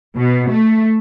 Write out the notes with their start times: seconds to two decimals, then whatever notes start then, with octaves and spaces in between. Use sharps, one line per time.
0.17 B2
0.48 A3